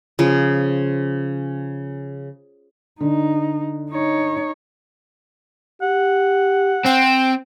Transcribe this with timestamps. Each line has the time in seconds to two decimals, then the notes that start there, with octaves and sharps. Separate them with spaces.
0.19 C#3 F3
3.00 D3 D#4
3.91 D#4 C#5
5.82 G4 F#5
6.86 C4 G5